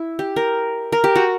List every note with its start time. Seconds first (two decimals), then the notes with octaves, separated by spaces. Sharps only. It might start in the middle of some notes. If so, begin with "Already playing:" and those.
Already playing: E4
0.19 G4
0.36 A#4
0.92 A#4
1.04 G4
1.16 F#4